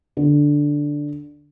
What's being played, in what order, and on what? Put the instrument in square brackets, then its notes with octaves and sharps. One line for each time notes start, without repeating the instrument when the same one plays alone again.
[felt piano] D3